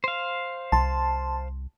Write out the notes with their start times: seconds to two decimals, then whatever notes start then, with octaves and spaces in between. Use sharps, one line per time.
0.04 C5 F5
0.72 C2 A5 C6